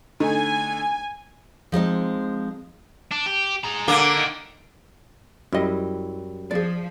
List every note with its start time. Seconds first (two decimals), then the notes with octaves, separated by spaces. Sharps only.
0.20 D3 A3 D#4 G#5
1.72 F3 G#3 C4 D#4
3.12 D4
3.27 G4
3.64 G#4 A#5
3.88 D3 A#3
4.17 D#3
5.53 F#2 G3 E4 D#5
6.51 F3 G#4 D5